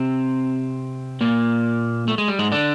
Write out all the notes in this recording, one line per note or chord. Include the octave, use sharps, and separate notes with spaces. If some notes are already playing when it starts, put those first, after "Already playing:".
Already playing: C3 C4
A#2 A#3
A3
G#3
G3
G#2 G#3
D3 D4